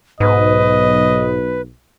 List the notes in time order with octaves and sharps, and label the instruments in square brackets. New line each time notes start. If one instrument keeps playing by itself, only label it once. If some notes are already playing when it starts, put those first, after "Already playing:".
[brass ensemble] B1 [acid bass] G#2 [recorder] B4 [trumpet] D#5